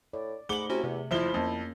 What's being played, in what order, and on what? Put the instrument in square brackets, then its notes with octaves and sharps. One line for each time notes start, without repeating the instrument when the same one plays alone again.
[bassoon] A2 [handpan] D5
[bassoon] G#2 [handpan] A3 G#4 [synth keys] F#5 B5 D6 [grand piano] F#7 G7
[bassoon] C3 [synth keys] C#4 E4 F#4
[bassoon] E2 [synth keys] C3
[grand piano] F#1 F3 G7 [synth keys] E4 E5 [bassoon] C5
[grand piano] F2 [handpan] A#3 C#4